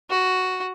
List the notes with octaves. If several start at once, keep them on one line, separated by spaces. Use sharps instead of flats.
F#4